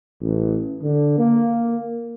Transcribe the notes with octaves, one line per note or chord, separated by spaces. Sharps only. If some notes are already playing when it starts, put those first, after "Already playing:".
A1
D3
A#3